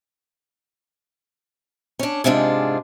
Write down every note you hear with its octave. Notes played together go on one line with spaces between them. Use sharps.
C#4 D4
G#2 C3 G#3 D4 F4